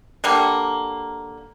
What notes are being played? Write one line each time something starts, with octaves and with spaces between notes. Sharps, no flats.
D3 G3 A#3